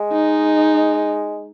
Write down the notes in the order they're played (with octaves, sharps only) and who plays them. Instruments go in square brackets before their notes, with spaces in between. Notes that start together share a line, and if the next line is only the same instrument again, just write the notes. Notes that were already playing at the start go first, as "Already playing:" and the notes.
Already playing: [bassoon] G#3
[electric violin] D#4